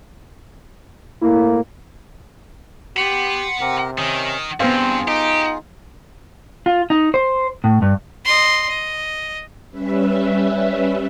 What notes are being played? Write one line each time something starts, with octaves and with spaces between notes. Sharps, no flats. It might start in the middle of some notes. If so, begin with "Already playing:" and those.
A2 A#3 E4
G4 F#5 B5 C6
C3 C4 G4 A#4
D#3 C#4
G2 B3 C4 F4 G#4 C5 F5
D#4 G4
F4
D#4
C5
A2
G2
D#5 C6
D#5
G3 C#4 B4 E5